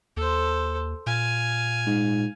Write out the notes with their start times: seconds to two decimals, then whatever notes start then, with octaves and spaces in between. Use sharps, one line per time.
0.17 D#2 A4 C5
1.06 A#2 F5 G#5
1.86 G#2